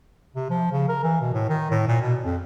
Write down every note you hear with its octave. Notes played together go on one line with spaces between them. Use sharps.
C3
F3
C#3
A#4
E3
B2
A2
D#3
A2
A#2
B2
F2